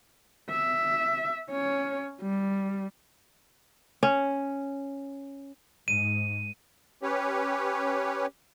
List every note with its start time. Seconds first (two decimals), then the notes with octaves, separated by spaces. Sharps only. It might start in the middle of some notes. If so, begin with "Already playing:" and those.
0.50 E5
1.51 C#4 C#5
2.21 G3
4.03 C#4
5.88 G#2 D#7
7.03 C#4 G4 B4 C#5